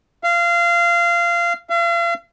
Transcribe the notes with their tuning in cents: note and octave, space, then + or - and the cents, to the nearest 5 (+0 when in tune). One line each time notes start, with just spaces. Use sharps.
F5 -20
F5 -40